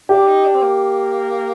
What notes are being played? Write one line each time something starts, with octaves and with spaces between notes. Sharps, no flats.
D4 G4
D#4
D4
C4
A#3